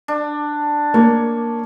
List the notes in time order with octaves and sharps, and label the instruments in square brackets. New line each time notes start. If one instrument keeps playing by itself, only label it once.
[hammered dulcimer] D4
[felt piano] A#3 [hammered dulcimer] C#5